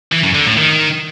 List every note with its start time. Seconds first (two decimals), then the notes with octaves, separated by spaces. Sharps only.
0.12 E3
0.23 F#2
0.35 D3
0.46 A2
0.57 D#3